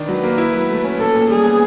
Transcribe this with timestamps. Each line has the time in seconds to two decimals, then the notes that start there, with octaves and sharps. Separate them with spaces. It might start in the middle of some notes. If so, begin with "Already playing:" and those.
Already playing: D#3 D4
0.08 F#3 B4
0.23 A#3
0.38 E4
0.54 F#3
0.69 A3
0.84 C#4
0.99 A#2 A4
1.14 A#2
1.30 G3 G#4
1.45 B3